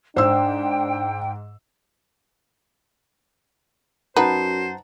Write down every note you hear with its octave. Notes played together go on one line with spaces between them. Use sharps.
G#2 D4 C5 G5 E6
F#2 D#4 B4 C5 F#5 A5 A#5